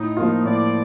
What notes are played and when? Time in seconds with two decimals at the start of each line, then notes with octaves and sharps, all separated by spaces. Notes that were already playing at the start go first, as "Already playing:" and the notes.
Already playing: A2 D#4
0.16 F3 A#3 F4
0.44 A2 D5